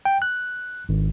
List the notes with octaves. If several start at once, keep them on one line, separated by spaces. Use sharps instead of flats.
G5
F#6
G#1